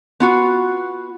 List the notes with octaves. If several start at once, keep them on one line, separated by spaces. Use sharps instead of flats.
B3 F4 F#4